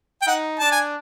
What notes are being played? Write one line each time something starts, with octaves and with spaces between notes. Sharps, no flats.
G5
D#4 F#5
D4 A5
G#5